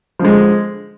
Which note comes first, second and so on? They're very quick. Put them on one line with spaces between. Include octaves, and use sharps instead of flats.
F3 D3 G#3